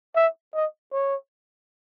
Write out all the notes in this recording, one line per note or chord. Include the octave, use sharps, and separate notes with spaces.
E5
D#5
C#5